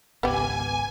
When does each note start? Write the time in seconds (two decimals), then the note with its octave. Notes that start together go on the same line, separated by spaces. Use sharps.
0.23 G#1 C#2 B3 G4 G#5